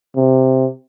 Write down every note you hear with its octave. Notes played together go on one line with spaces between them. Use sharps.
C3